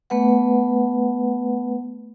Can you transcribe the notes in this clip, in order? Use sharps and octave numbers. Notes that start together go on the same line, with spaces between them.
A3 B3 B4 F#5